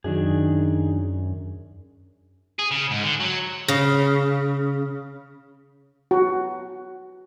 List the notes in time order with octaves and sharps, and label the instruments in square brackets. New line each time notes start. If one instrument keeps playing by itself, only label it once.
[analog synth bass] F#2 [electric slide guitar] D#3 D4 G#4
[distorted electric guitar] G#4
C#3
G#2
D3
F#3
[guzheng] C#3
[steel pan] F#4